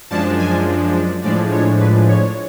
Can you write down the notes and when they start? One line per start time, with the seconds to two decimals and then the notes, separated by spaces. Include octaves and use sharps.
0.10 F#2 F3 G#3 D4 A5
0.39 G#5
1.23 A2 F3 G#3 D4 D5
1.51 C#5
1.80 B4
2.08 C#5